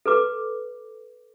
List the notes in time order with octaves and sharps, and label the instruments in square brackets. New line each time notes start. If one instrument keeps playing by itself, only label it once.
[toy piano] A4 B4 D6